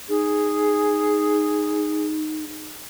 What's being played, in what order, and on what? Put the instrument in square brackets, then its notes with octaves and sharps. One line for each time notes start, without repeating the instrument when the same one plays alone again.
[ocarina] D#4 [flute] G#4